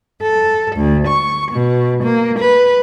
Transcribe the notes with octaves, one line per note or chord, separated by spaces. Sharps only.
A4
D2
C#6
B2
A#3
B4